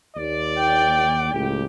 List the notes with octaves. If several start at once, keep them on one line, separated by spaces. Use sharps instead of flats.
D#2 D5
G5
C#2 A2 G4